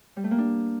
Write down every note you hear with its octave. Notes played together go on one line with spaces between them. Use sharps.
G3
A3
A#3
D4